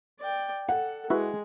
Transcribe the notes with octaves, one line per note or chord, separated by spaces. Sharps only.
D5 G5
A4 F#5
G#3 E4 F#4 G#4 B4